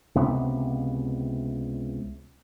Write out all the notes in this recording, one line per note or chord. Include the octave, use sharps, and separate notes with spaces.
C#2 C3 B3